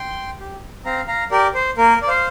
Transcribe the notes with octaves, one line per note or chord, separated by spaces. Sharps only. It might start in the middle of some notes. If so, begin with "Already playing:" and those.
Already playing: G5 C6
G4
C4 F5 A#5
F5 A#5
G4 A#4 D5
C5
A#3 A#4
D5
C5 F5